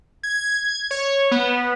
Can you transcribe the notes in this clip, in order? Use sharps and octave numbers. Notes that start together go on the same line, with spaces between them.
G#6
C#5
B3